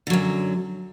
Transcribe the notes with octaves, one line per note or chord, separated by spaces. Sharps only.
F#2 D3 F#3